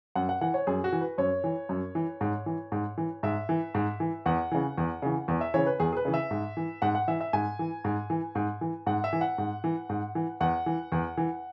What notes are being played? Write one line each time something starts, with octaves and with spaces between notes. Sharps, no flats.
F#2 F#5
F#5
E3 F#5
C#5
F#2 G#4
F#4
E3
B4
F#2 C#5
E3
F#2
E3
G#2
E3
G#2
E3
G#2 E5
E3
G#2
E3
E2 F#5
C#3 E3
E2
C#3 E3
E2
E5
C#3 E3 C#5
B4
E2 G#4
G#4
B4
C#3 E3
E5
G#2
E3
G#2 F#5
F#5
E3 E5
E5
G#2 G#5
E3
G#2
E3
G#2
E3
G#2 F#5
E5
E3
F#5
G#2
E3
G#2
E3
E2 F#5
E3
E2
E3